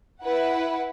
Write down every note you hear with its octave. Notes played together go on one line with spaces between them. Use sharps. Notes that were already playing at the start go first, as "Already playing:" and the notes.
E4 B4 F#5